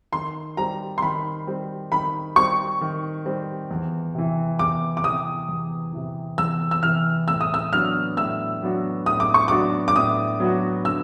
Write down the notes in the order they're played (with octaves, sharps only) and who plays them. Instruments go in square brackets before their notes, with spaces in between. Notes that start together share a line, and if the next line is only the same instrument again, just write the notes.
[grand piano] D#3 [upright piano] C6
[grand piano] G3 C4 [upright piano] A#5
[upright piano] C6
[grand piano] D#3 [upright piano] B5
[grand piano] G3 C4
[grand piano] D#3 [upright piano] B5
[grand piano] G3 C4 [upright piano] C#6
[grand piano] D#3
G3 C4
E2
C3 E3
[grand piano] E2 [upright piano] D6
[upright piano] D6
[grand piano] C3 E3 [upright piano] D#6
[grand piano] E2
C3 E3
[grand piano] E2 [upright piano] E6
[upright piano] E6
[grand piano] C3 E3 [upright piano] F6
[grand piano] A2 [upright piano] E6
[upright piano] D#6
E6
[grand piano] F#3 B3 D4 F#4 [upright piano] F6
[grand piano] A2 [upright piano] E6
[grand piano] F#3 B3 D4 F#4
[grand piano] A2 [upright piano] D#6
[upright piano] D6
C#6
[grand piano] F#3 B3 D4 F#4 [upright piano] D6
[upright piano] D6
[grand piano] A2 [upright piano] D#6
[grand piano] F#3 B3 D4 F#4
[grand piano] D3 [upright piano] E6